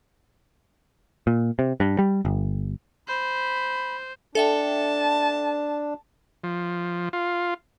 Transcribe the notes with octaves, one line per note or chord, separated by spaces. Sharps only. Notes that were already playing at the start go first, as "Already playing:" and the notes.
A#2
C3
G2
G3
G1
C5 B5
D4 A4 E5 G5 A5
F3
F4